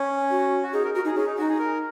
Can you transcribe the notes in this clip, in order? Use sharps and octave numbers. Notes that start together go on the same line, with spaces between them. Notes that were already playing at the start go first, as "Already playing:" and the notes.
Already playing: C#4
F#4
F#4
D#4 G#4
A#4
F#4 A#4
D#4 G#4
C#4 G#4
D#4
D#4 F#4
G#4
A#4